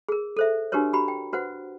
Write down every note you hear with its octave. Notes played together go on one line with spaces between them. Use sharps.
G#4 A#4
A4 C5 E5
D4 F#4 G4 A#4 B4 C#5
F#4 G4 A#5 B5
G5
F#4 B4 C5 F#5